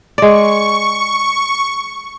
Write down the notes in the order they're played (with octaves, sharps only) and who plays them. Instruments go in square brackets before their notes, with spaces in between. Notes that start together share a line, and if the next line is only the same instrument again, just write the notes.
[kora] G#3 D5 [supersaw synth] C#6